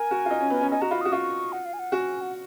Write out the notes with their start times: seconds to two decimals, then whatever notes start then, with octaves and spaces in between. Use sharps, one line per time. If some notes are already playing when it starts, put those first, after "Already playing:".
Already playing: A#4 G#5
0.11 F#4
0.25 F4
0.30 D#4
0.41 C#4
0.50 B3
0.61 C#4
0.71 D#4 G#5
0.81 F#4 A#5
0.91 F4 B5
1.01 F#4 D#6
1.12 F4 C#6
1.52 F#5
1.65 F5
1.73 G#5
1.79 F#5
1.92 F#4 G#5
2.21 F#5